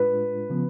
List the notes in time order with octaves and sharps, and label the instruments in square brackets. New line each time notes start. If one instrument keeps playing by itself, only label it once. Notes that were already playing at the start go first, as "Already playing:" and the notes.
Already playing: [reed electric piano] A2 G#3 D4 F4 [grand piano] B4
[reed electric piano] C#3 F3 B3